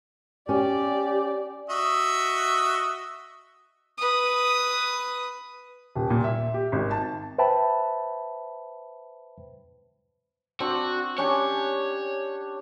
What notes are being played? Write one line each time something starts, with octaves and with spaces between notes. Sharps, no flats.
C#4 G4 D5
F#4 D#5 E5
B4 D#6
D#1
A#2
E5
G4
G#1
A5
B4 C5 E5 G5 A5 B5
C4 D4 F#4
C#4 D4 G4 C#5